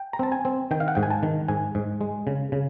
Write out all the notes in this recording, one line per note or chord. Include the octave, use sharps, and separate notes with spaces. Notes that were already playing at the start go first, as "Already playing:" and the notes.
Already playing: G5
A#5
C4 A5
G#5
C4
D#3 G5
F5
F#5
G#2 G5
G#5
A5
D#3
G#2 G#5
G#2
G#3
C#3
C#3